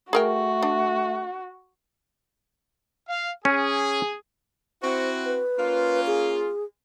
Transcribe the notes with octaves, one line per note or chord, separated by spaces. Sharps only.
A3 F#4 G#4 A#4 G5
D4
F5
C#4 G#4
C4 E4 F#4 C5
B4
A#3 C#4 F4
G#4